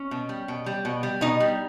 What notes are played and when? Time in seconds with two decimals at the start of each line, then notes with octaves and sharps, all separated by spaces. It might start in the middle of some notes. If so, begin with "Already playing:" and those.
Already playing: C#4
0.11 B2
0.29 G3
0.48 B2
0.66 G3
0.85 B2
1.03 G3
1.21 B2 D#4
1.40 G3